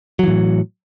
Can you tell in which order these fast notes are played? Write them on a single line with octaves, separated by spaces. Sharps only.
F#3 E3 A2